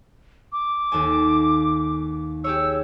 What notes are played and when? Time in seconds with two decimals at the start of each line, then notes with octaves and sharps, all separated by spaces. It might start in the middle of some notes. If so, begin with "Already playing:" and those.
0.52 D6
0.92 D#2 A4 G#5
2.44 G4 G#4 C#5 E6